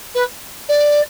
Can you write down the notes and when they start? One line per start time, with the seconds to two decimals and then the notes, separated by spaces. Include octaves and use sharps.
0.15 B4
0.69 D5